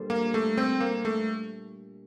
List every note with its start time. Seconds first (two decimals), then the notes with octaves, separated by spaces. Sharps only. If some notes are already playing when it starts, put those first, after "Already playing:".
Already playing: A#2 G3 D4 A4 C5
0.10 A#3
0.34 A3
0.57 C4
0.80 A#3
1.05 A3